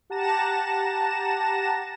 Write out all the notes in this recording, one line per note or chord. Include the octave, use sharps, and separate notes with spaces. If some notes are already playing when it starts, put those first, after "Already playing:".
G4 F#5 A5 A#5 A#6 E7